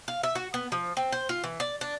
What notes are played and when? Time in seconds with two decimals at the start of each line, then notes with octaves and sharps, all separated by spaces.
0.08 F5
0.23 E5
0.35 F#4
0.54 B3
0.72 F3
0.97 C4
1.12 C5
1.29 F4
1.44 E3
1.60 D5
1.81 D4